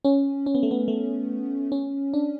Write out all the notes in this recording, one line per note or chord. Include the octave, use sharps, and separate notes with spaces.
C#4
C#4
B3
A3
B3
A3
C#4
D4